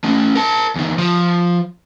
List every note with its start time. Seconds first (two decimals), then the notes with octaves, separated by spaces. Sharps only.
0.04 A3 C#4
0.36 A#4 A5
0.76 E2 D#3
0.98 F3